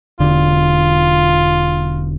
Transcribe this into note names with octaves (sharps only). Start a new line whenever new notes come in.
E1 D3 F4